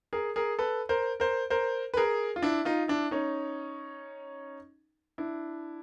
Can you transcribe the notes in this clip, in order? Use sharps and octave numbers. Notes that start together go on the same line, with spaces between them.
G#4 A#4
G#4 A#4
A4 B4
A#4 C5
A#4 C5
A#4 C5
B4
G#4 A#4
F4
D4 E4
D#4 F4
D4 E4
C#4 D#4
D4 E4